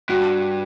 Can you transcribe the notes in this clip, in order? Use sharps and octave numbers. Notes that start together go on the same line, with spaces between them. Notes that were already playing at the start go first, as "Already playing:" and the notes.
G2 F#4